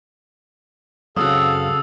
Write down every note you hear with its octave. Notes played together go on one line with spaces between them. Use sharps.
F#2 C#3 C4 F#4 A4 F5 D#6 E6